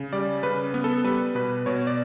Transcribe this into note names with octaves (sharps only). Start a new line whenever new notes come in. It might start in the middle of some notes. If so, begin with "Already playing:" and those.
Already playing: C#3
G3 D5
C#3 B4
B3
A4
G3 B4
B2 B4
B2 C#5
D5